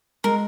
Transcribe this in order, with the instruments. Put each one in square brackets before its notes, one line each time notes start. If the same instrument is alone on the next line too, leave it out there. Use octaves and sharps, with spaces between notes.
[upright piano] G#3 [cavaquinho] A#4